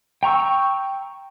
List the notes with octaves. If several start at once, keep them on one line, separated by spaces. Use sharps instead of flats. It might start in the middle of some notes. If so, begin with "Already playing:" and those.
G5 A#5 C#6 E6